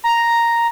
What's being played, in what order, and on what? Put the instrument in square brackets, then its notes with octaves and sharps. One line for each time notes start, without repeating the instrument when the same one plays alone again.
[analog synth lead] A#5